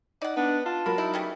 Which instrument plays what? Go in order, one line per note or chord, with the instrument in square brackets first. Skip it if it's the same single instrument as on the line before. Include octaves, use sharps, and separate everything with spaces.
[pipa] D#4 F#5 [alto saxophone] D5
[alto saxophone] B3 [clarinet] D4
[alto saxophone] F4 [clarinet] A5
[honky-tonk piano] F#3 A#4 B5
[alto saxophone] D#4 [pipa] E4
[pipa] C#3 G3 A3